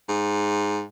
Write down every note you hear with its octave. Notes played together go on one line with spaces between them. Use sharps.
G#2